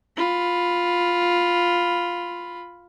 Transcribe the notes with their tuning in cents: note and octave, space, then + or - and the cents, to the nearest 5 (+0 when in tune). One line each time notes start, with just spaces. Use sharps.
F4 +5 B5 +0